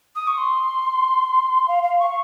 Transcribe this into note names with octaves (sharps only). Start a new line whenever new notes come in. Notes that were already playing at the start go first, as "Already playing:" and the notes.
D#6
C#6
C6
F5
F5
C#6